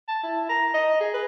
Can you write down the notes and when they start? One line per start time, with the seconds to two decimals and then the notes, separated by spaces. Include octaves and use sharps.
0.08 A5
0.23 E4
0.49 A#5
0.74 D#5
1.00 G#4
1.14 B4